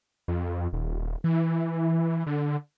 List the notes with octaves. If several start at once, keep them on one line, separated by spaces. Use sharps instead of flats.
F2
D#1
E3
D3